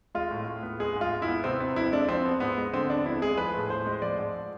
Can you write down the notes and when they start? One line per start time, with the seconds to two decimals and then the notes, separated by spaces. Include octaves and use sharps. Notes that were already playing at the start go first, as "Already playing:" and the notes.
0.15 G#3 F4
0.31 A2
0.47 A2
0.63 B3
0.80 G#3 G#4
0.96 G#2 F4
1.11 G#2
1.22 E4
1.28 B3
1.44 C3 C4
1.60 B3 C4
1.76 F2 E4
1.92 G#3 D4
2.09 F3 C4
2.25 B3
2.40 G#2 B3
2.58 G#3
2.73 D3 C4
2.90 B3 D4
3.05 F2 E4
3.22 G#3 G#4
3.37 F3 B4
3.54 A2
3.70 A2 C5
3.86 G#3
4.02 F3 D5
4.19 G#2